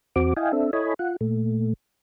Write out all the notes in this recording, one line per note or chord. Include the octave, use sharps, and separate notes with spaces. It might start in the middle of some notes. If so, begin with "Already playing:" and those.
E2 C4 F#4 D6
E4 D#5 F5 G5 G#5
C4 D4 A4 E5
E4 A4 C#5 D#5 G#5 B5
F4 F#5
A#2 A3